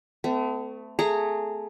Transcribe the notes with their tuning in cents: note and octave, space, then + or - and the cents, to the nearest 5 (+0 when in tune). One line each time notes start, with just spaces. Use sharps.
A3 +5 C4 -45
A3 +0 G#4 +0 A#5 -20